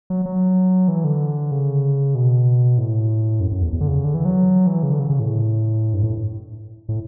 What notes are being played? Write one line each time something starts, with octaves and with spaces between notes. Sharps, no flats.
F#3
F#3
E3
D3
C#3
B2
A2
F#2
F#2
E2
E2
D3
C#3
D3
E3
F#3
E3
C#3
D3
C#3
C#3
A2
G2
A2
A2